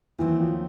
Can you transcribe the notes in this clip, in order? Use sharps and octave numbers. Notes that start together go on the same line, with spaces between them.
D#2 D#3 E3 F#3 A3 C4
F3